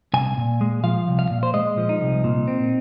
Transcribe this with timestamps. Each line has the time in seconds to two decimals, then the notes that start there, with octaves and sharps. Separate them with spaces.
0.14 C2 G#5
0.37 A#2
0.61 G#3
0.83 F3 F5
1.08 C2
1.19 F5
1.30 A#2
1.43 C5
1.54 G#3 D#5
1.77 F3
1.89 D#4
2.01 C2
2.24 A#2
2.48 C4